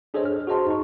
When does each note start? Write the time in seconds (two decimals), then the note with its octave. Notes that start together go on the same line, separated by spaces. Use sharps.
0.14 D4 G#4 A4 C5 C#5 D#5
0.25 F6
0.47 F#4 G#4 C5 D#5 A5 C6
0.66 D#4 C#6